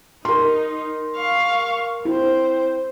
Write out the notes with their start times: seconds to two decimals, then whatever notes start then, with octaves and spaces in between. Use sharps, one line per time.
0.25 D#4 A#4 C6
1.16 F5 C#6
2.05 C4 E4 C5